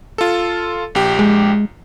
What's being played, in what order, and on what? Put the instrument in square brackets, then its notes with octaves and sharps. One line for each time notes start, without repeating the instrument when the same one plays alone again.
[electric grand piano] F4 A4
A#1 G4
[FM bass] G#3